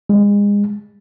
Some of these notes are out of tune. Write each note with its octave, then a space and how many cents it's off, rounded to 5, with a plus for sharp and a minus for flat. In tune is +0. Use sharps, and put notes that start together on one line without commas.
G#3 -30